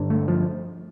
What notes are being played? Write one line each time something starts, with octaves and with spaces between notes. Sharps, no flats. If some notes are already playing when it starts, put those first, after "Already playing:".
Already playing: G2 D3
A3
F3